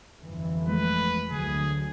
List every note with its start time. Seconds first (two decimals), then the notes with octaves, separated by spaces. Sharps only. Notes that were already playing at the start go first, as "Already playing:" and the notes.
0.18 G1 F2 E3
0.68 F3 G#3 A3 B4
1.31 D2 D3 F#3 G#4